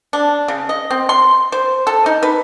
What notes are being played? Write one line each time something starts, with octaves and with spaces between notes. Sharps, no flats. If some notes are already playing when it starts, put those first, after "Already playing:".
D4
C#3
D#5
C4
C6
C5
A4
D#4
B4